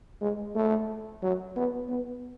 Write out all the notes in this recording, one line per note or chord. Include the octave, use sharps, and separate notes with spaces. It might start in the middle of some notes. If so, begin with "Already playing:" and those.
G#3
A3
F#3
B3
B3